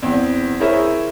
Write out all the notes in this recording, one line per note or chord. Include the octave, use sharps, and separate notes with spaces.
E2 C4
E4 G#4 A#4 C5 C#5 E5